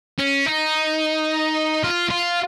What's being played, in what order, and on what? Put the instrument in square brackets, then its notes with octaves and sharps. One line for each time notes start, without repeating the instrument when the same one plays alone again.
[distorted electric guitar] C#4
D#4
F4
F4